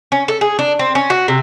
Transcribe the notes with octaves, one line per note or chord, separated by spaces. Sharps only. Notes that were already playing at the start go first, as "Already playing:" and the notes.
C#4
A4
G#4
D4
C4
C#4
F#4
C3